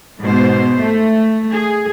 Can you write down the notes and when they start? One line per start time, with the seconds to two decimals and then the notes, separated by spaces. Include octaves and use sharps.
0.21 G#2 B2 C5
0.82 A3
1.51 G#4